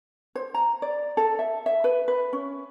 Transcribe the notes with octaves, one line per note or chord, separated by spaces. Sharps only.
C5
A#5
D5
A4
E5
E5
B4
B4
C#4